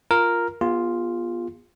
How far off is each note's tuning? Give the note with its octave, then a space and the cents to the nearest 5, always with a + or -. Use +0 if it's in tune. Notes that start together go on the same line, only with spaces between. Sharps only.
F4 +0 A#4 +0
B3 -30 F4 +0 G#4 -40